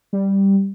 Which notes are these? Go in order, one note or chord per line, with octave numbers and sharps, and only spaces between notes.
G3